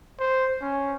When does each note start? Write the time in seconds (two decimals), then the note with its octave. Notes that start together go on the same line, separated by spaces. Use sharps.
0.19 C5
0.61 C#4